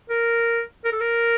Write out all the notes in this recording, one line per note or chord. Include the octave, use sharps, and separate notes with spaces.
A#4
A#4
A4
A#4